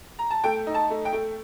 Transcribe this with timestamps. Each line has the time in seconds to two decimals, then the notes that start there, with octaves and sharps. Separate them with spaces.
0.19 A#5
0.30 A5
0.44 A3 G5
0.67 D#4
0.74 A5
0.90 A3
1.05 G5
1.13 A3